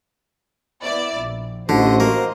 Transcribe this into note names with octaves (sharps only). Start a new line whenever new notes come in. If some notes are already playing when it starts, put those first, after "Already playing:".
B3 E4 D5
A#1
A1 D3 F#4 C5 D#5
A#3